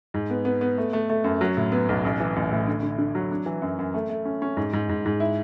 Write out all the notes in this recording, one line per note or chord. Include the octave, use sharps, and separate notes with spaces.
G#2
B3
B3
B3
A3
A3
A3
F#2
F#3
A2
B3
B1
A1
E3
A1
A2
D3
D3
D3
F#3
D4
E3
F#2
F#2
A3
A3
C#4
C#4
G#2
G#2
G#2
G#2
E4